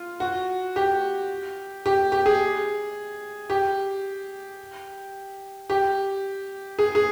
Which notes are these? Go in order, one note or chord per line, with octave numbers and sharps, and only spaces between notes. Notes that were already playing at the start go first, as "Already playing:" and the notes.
Already playing: F4
F#4
G4
G4
G4
G#4
G4
G4
G#4
G#4